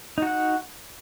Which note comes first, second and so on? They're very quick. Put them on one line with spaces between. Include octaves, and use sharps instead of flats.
D#4 F#4 F#5